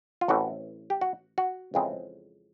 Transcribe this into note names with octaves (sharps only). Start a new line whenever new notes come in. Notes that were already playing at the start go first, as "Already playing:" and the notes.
F4
A1 A2 E3 A3 C4 F#4
G4
F#4
F#4
F2 C#3 E3 G#3 C4